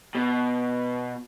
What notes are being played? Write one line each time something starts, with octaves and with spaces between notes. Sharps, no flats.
B2